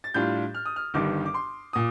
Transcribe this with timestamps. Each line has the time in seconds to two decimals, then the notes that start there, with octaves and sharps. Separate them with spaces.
0.04 A6
0.14 A2 G3 D4 F4 G6
0.54 F6
0.66 D#6
0.76 F6
0.94 G1 G2 D#3 G3 D6
1.25 D6
1.34 C6
1.73 A#2 D#6